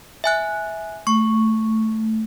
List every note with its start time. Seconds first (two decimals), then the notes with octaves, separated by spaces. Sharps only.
0.24 E5 G#5 F#6
1.07 A3 C#6